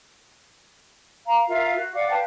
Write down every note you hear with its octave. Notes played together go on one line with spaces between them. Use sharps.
F5 A#5
F4 A#4 E5 F5
F#4
D5 F5 F#5 D6
B4 F5 G5 A5